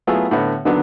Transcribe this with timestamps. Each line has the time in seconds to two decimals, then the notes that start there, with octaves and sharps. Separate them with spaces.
0.07 F#3 A3 B3 E4 F4 G#4
0.31 A2 D3 B3
0.65 D3 D#3 F#3 B3 D4